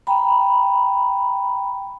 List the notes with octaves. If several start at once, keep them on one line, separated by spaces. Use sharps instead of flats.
G5 A#5 B5